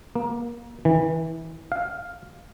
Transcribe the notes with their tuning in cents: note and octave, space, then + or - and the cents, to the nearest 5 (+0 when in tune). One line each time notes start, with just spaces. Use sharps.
A#3 +25
E3 -25
F5 +5